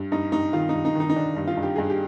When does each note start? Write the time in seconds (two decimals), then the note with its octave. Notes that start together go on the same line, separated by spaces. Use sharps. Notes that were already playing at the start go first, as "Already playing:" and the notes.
Already playing: G2
0.12 G2 D#4
0.32 G2 D#4
0.53 D#3 F4
0.69 D#4
0.74 G2
0.85 D#4
0.95 D#3 D#4
1.10 D#4
1.16 D#3 D4
1.36 G2
1.47 F4
1.57 G2
1.63 G4
1.76 G2 G#4
1.90 G4